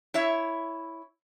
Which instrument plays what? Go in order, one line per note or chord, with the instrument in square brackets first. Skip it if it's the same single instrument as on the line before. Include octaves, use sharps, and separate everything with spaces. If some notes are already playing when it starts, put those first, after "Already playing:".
[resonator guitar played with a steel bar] E4 C#5 E5